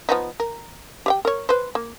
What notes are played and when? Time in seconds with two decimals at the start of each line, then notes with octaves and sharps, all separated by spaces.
0.09 F3 B3 D#4
0.40 A#4
1.06 G4 F5 G5
1.25 A#4 C#5
1.49 B4 C5
1.75 A#3